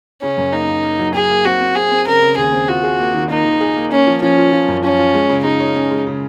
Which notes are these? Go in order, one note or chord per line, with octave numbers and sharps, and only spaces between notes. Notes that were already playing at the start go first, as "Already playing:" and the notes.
C#3 C#4
F#2
A#3 D#4
C#3
A#3
F#3
F#3 G#4
A#3
C4 F#4
C4
C4 G#4
C4
C#3 A#4
C#3
D#2 G#4
C4
F4 F#4
G#4
A#3
D#3
A#3 D#4
D#3
G#4
A#3
A#3 C#4
F3
F3 C#4
F4
F3
F#2
F3 C#4
F4
G#3
C#3
G#3 D#4
C#4
C#4
G#3
C#3